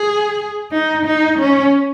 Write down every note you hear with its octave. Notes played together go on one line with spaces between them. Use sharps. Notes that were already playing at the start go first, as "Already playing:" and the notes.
Already playing: G#4
D#4
D#4
C#4